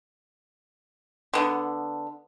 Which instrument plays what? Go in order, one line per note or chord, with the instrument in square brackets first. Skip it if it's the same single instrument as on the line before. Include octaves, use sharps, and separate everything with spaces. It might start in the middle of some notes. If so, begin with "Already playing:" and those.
[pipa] D3 B3